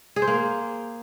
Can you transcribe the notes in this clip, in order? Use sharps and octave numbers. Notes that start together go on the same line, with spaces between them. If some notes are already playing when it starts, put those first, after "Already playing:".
G#4
C5
A#3